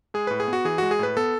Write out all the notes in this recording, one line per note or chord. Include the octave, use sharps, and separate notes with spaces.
G#3 G#4
A2 B4
G#4
B3
F#4
E3 G#4
G#3 F#4
G#4
A2 B4
B3 A4